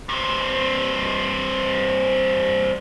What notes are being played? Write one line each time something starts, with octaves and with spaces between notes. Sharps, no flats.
G2 C4